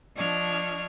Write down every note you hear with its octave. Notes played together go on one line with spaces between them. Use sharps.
F3 D4 D#5 C#6 F6 G#6